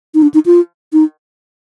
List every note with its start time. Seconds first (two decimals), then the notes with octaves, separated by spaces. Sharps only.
0.14 D#4
0.22 D4
0.34 D#4
0.46 F4
0.93 D#4